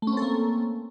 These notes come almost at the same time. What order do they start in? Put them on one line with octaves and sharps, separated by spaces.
A3 C#4 C4 A4 A#3